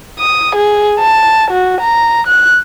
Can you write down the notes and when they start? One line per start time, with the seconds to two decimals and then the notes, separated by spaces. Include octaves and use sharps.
0.19 D#6
0.55 G#4
0.99 A5
1.51 F#4
1.81 A#5
2.27 F#6